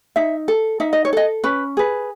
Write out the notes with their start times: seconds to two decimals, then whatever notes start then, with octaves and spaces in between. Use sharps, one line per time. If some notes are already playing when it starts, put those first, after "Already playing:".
0.16 D#4 E5
0.48 A4
0.80 D#4 E5
0.93 D#5
1.05 C#5
1.13 A4 D#5
1.44 C#4 B4
1.77 G#4 B4